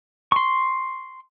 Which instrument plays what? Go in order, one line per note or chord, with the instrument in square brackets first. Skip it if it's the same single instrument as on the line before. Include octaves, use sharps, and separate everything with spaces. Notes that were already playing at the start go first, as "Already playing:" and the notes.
[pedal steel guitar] C6 C#6